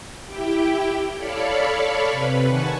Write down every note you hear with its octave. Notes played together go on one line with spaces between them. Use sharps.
E4 G4 G5
A4 C#5 D5 F5 B5 C#6
C3 B4
D#3 F#5 G#5 A5 C#6